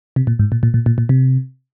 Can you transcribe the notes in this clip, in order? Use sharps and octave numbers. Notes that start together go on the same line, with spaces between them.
C3
A#2
G#2
A#2
A#2
A#2
A#2
A#2
C3